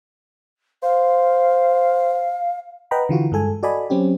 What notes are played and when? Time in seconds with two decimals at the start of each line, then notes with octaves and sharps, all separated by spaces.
0.82 C5 F5
2.91 B4 D#5 F#5 G5 A#5 B5
3.09 D3 E3 F4 F#4
3.32 G2 G#3 A4 G#5
3.63 F#4 A4 D5 D#5 G#5 B5
3.90 F#3 C4 C#4 G4